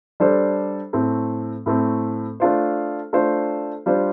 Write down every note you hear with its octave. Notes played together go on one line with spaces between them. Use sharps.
G3 D4 A4 C5
A2 A3 C4
A2 A3 C4
A3 D4 F4 C5
A3 D4 F4 C5
G3 D4 F4 C5